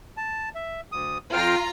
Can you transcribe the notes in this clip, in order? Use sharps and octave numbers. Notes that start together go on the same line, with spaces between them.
A5
E5
D2 D#6
F2 F4 G5 A#5 F6